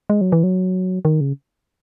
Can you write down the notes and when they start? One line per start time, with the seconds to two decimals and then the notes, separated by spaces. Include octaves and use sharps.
0.10 G#3
0.21 F#3
0.32 E3
0.43 F#3
1.05 D#3
1.21 C#3